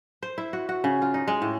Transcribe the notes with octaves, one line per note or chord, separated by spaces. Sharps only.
C5
E4
F#4
F#4
C#3
F4
D#4
G#3
A2